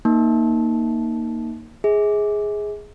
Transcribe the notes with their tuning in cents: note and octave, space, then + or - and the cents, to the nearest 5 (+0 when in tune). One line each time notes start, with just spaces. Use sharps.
A#3 +0 D#4 +0 A5 -15
G#4 +0 E5 -45